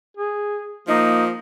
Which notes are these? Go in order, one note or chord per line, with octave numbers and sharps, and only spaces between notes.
G#4
F3 A#3 D#4